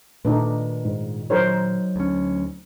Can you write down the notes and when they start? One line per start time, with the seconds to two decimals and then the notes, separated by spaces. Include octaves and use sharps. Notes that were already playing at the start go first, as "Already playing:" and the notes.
0.25 A#2 D#3 A3 D4 D#4 B4
0.85 G#2
1.30 F#3 D#4 A#4 C5 C#5
1.96 D2 C#4